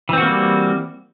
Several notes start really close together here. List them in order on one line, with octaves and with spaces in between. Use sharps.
E3 C4 F#4 A#3 G3